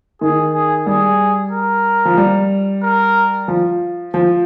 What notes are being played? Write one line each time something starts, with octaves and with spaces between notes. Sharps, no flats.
D#3 G#4
G#4
G3 G#4
A#4
F3
G3
A#4
F3
F3